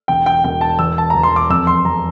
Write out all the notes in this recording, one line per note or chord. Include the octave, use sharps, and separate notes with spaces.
E1 G5
G5
E1 G5
A5
E2 E6
A5
E2 A#5
C6
D6
F2 E6
C6
F2 A#5